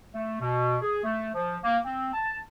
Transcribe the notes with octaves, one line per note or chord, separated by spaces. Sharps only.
A3
B2
G#4
A3
F3
A#3
C4
A5